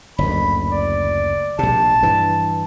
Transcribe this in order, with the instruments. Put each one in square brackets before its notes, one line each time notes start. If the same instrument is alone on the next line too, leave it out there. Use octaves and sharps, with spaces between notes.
[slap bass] F#1 D2 [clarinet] B5
[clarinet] D5
[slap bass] A#1 C3 [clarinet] A5
[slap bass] G2 E3